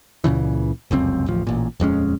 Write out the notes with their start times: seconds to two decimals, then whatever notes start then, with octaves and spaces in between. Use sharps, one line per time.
0.24 C#2 A#2 C#3 E3
0.91 F1 C#2 F#2 C4
1.26 D1 A1 F3
1.47 A1 A#2
1.80 D#1 F2 G#3 C#4